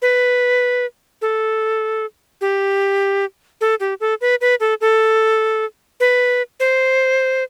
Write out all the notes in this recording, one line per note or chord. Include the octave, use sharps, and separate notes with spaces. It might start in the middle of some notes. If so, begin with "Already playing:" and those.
B4
A4
G4
A4
G4
A4
B4
B4
A4
A4
B4
C5